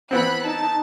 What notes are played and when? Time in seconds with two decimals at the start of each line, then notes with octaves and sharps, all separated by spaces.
0.11 E3 B3 C4 B5 F#6
0.44 D#4 A5